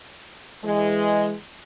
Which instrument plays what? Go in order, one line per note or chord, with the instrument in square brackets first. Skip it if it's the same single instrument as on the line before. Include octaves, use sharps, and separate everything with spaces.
[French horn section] E3 G#3